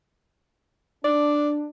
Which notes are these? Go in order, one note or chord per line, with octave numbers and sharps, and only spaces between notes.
D4 D5